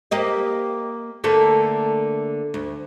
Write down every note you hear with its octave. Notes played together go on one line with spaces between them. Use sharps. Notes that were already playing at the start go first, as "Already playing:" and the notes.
A#3 G4 D#5
D3 A3 A#3
D2